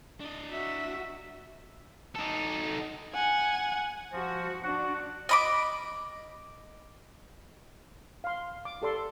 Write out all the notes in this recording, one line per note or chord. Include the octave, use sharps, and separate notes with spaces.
D4 D#5
F#4 E5
D#4 A4
F#5 G#5
F3 F#4
D4 F#4 F#5
D#5 B5 D6
F5 C6
D6
G4 A4 D5 C6